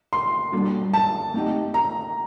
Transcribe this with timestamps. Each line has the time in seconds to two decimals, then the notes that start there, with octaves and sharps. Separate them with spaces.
0.13 C6
0.52 G3 A#3 D4 F#4 A4
0.93 A5
1.34 A3 C4 D#4 G4
1.74 A#5